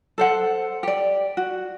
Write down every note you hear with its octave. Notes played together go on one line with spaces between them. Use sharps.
A4 C5 F#5
G4 D5
F#4